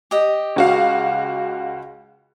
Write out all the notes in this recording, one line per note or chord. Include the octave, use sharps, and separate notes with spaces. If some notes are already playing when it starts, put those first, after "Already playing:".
G4 D#5
C#2 F#4 F5